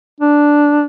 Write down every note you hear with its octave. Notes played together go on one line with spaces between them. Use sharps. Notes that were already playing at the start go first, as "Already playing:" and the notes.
D4